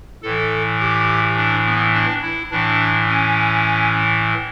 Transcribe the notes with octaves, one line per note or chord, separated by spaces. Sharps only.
A2 E3 A4
G4
D4
B3
D4
E4
A2 E3 D4
C#4